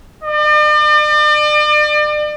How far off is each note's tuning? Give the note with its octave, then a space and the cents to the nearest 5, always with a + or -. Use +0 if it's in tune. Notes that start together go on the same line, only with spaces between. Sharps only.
D5 +40